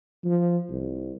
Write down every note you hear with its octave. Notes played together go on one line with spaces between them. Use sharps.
F3
C2